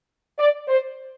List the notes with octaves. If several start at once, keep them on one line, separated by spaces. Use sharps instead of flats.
D5
C5